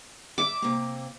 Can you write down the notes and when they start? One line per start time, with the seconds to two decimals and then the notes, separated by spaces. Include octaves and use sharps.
0.38 D5 E5 D6
0.62 C3 A#3